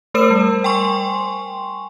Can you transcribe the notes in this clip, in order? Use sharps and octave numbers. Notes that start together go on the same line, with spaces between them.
A3 A#4 C5 E6 E7
G3
G5 G#5 C6 C#6